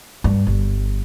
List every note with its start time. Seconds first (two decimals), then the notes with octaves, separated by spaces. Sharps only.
0.24 G2
0.47 G1